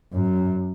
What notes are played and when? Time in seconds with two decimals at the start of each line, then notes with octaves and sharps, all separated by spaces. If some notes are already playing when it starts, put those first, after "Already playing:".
0.13 F#2